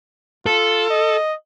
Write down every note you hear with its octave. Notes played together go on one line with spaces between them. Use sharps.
F4 A4
D#5